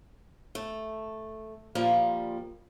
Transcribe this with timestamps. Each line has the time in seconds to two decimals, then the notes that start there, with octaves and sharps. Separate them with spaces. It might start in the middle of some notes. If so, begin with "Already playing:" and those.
0.55 A3
1.75 A#2 F3 G3 A#3